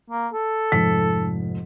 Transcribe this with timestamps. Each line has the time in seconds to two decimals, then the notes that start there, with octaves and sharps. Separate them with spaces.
0.10 A#3
0.33 A4
0.72 F1 G#2 B6